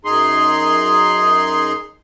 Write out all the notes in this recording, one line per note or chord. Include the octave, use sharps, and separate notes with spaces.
F#2 D#4 G#4 C6